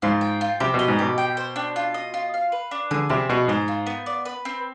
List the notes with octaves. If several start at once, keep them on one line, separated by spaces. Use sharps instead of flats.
G#2 F4
G5
F4
C3 G4
B2
D#5
G#2
B2 G4
G5
C5
D4
F4
D#5
F4
F5
B4
D4
D3 G#4
C3 D5
B2 G#4
G#2 C5
F4
B3
D5
B4
C4